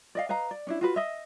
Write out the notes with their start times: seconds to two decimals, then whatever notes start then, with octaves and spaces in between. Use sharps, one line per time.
0.15 D5 D#5 F5
0.29 B4 D#5 F5 A#5
0.51 D5
0.67 C#4 D4 E4
0.81 F4 F#4 B4
0.96 D#5 E5